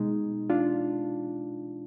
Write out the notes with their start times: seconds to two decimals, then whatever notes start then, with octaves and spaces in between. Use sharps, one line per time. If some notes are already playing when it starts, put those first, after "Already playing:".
Already playing: B2 G#3 D#4
0.50 D4 F4